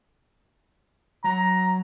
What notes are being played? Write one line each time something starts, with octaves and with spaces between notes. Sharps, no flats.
F#3 A#5